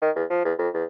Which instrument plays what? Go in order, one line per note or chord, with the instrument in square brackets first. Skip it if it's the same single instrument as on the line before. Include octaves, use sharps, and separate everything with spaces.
[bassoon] D#3
E2
F3
E2
F2
E2